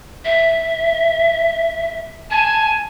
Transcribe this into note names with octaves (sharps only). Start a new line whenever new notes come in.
E5
G#5 A5